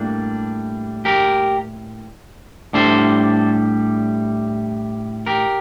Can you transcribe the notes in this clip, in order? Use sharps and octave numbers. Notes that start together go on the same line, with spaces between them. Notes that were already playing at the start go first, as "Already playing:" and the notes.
Already playing: A2 G3 A#3 D4
G4 A#4
A2 G3 D4 A4 C5
G4 A#4